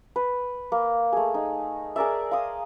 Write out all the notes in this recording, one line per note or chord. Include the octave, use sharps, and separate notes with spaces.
B4
A#3
A3 G#4
D#4
G#4 A#4 D5 E5
F5 C6 D#6